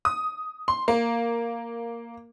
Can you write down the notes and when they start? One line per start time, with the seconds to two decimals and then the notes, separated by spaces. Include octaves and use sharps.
0.05 D#6
0.68 C6
0.88 A#3